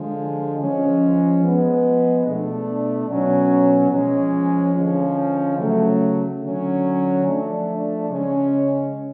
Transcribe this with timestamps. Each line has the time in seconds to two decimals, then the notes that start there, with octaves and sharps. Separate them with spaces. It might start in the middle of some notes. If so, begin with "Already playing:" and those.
Already playing: D3 F3 G#3
0.59 F3 G#3 C#4
1.42 F3 G#3 B3
2.25 B2 A3 D4
3.08 B2 F#3 C#4
3.92 F3 G#3 C#4
4.75 D3 F3 G#3 C#4
5.58 C#3 F#3 A3
6.41 D3 F#3 C#4
7.25 F3 A3 D4
8.08 C#3 G#3 C#4